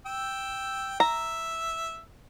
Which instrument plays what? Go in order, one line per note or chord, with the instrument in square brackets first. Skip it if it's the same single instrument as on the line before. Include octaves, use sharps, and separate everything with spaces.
[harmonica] G5 E6
[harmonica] E5 [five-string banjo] A#5